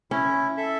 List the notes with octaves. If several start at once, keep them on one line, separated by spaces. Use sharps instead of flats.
C#4 E4
A4 E5